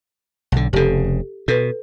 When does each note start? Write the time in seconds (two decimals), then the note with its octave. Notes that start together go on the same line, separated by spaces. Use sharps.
0.52 B1 D3
0.73 F1 C#3 G4 A4
1.48 B2 A4 B4